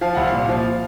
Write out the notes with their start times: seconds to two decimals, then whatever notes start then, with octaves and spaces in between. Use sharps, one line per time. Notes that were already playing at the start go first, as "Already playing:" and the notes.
0.01 F3 F5
0.15 C2 F#5
0.27 A#2 F5
0.48 F3